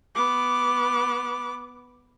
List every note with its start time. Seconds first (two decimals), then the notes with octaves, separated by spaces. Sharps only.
0.15 B3 D6